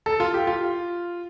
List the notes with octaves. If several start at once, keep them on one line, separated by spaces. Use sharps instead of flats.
A4
F4
G4
F4